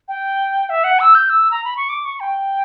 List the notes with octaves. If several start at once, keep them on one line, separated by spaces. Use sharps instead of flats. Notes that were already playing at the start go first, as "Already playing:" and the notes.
G5
E5
F#5
E6
G6
E6
A#5
B5
C#6
D6
C#6
G5